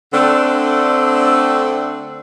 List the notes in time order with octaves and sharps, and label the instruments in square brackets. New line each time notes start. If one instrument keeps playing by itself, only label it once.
[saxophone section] D3 A3 C4 D4